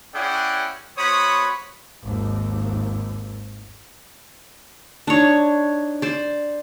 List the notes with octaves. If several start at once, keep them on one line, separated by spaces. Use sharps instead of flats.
C#4 E4 G#4 D5 F#5 G5
B3 F#4 C5 C#5 B5 D#6
G#1 D#2
D4 D#4 C#5
C5 D5